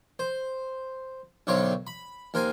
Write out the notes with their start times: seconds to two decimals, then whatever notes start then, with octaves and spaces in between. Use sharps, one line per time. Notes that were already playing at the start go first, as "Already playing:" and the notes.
0.19 C5
1.47 B1 D3 D#3 C5 C#5 C#6
1.87 B5
2.34 D#2 A#4 C5 G#5